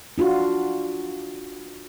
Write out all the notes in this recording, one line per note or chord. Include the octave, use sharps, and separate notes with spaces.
D4 F4 F#4